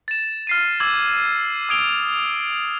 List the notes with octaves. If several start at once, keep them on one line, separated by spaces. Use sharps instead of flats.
A6 E7
F6 C7 D#7
D6 E6 G#6 F#7
D#6 E6 G#6 D7 F7 G7